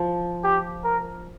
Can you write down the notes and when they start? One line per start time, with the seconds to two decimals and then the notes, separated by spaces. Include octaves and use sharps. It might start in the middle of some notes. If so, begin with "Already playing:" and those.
Already playing: F3
0.44 G4
0.84 A#4